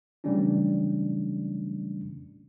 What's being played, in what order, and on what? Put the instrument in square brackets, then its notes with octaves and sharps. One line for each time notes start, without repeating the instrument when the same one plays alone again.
[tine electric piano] C#3 E3 G3 A3 C#4 D4